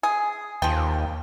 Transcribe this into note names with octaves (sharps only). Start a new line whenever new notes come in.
G#4
D#2 F3 G5